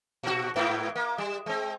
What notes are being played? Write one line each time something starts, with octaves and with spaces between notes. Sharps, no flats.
A#2 F#4
G#2 B3 E4
A#3
G3
G#3 C4